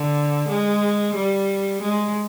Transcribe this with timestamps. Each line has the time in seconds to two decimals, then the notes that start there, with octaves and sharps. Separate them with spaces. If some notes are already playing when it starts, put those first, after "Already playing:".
Already playing: D3
0.49 G#3
1.15 G3
1.81 G#3